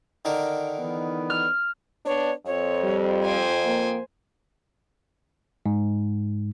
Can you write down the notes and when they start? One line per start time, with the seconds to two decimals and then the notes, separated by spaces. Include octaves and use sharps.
0.25 D3 D#3 A#4
0.77 E3 B3 D#4
1.30 F6
2.06 B3 D4 C#5
2.46 F2 C#5
2.84 G3
3.24 C5 G5 G#5
3.65 A#3
5.66 G#2